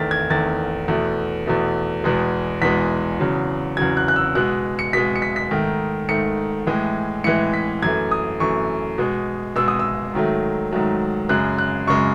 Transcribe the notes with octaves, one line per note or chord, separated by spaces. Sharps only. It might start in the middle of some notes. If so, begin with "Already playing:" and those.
Already playing: E2 D#3 A3 A6 B6
G#6
E2 D#3 A3 A6
E2 B2 A3
E2 B2 A3
E2 B2 G#3
E2 B2 G#3 B6
E2 C#3 F#3
E2 C#3 F#3 G#6
F#6
F#6
E6
B2 G#3 F#6
C#7
B2 G#3 B6
C#7
B6
B6
G#2 D#3 A3
G#2 D#3 A3 C#7
A2 E3 G#3
A2 E3 G#3 C#7
B6
F#2 E3 A3 G#6
D#6
F#2 E3 A3 C#6
B2 G#3
B2 G#3 E6
D#6
E6
G#2 D#3 F#3 A3
G#2 D#3 F#3 A3
F#2 C#3 G#3 F#6
F#6
F#2 C#3 G#3 C#6